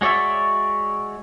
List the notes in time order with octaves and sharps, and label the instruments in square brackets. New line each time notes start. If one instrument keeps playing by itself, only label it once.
[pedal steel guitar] G#3 F#4 C#5 D5 E5